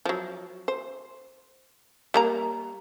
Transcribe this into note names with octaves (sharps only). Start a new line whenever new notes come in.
F3 F#3
C5
G3 A#3 A#5